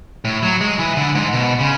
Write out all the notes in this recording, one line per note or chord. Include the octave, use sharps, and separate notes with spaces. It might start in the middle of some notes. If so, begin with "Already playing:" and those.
A2
F#3
G#3
E3
D3
G#2
B2
C#3